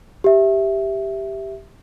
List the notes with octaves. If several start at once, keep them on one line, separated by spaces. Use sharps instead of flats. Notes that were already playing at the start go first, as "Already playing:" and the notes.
G4 E5